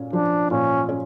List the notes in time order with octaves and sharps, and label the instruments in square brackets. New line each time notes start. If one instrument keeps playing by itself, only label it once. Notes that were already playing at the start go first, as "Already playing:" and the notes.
Already playing: [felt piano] A#2 C#4
[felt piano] F3 [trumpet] D4
[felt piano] A#2 [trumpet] C#4
[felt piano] C#4